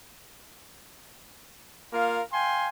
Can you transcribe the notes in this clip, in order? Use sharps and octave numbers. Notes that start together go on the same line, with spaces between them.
A#3 F4 A#4 F5
F5 G5 G#5 C6